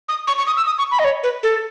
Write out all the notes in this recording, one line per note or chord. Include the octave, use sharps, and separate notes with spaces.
D#6
C#6
C#6
D#6
E6
D#6
C#6
B5
D#5
C#5
B4
A4